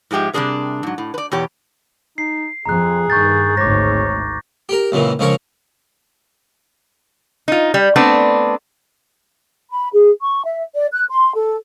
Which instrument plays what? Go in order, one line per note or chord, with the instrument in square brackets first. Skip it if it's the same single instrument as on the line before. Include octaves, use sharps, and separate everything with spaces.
[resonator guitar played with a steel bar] G#2 F3 G#3 G4 E5
C3 G3 G#3 D4 G#4 A#4
G#2 F#3
A2
B4 D5
E2 B2 G4 C#5
[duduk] D#4 [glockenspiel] C7
[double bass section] F2 [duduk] G#4 [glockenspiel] A#5 F#6
[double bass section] G2 D#3 [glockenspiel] C#6 G6 A6
[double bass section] G#1 D2 G#2 [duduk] C#5 [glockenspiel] D6 A#6
[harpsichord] G4 A#4
C#2 F#2 A#2 E3
C#2 F3 C#4 A#4 C#5
[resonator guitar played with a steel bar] D#4 F4
G3
A3 B3 C4 D4
[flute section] B5
G#4
C#6
E5
D5
F#6
C6
A4